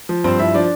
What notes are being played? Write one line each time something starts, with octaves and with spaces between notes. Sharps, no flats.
F3
G2 C4 C5
F3 E4 E5
F3 D4 D5